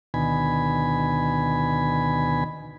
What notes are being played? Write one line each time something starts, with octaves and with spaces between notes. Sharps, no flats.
D2 B2 D#3 G#5 B5